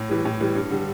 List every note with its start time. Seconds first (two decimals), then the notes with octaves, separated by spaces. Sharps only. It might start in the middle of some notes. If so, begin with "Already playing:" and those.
Already playing: A2
0.09 E3 G3
0.25 A2
0.40 E3 G3
0.55 G2
0.71 D3 G3